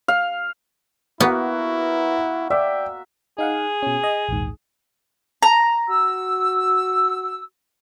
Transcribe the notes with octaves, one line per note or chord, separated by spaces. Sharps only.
F5
A#3 B3 E4 F#4 B4 F#5
D5 E5 G5 D6
D#4 G#4 F5 F#5
B2 C#4
D#5
A#1 D#2 G#2
A#5
F#4 E6